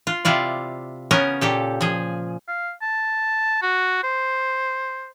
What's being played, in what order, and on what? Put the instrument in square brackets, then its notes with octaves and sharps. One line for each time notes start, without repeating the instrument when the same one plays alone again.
[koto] F4
C3 E4 F4 D5
C#3 B3 C#4 A#4
A#2 G4 A4
F3 G#4
[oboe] F5
A5
F#4
C5